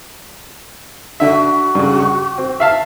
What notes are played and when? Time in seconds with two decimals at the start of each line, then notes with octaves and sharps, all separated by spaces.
1.20 D3 F#4 E5
1.75 G2 C#3
2.00 C#6
2.38 C4
2.60 E5 F5 A5